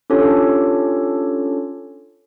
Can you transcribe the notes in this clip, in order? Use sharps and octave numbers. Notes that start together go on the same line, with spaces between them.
C#4 D4 F4 G4 A4 C#5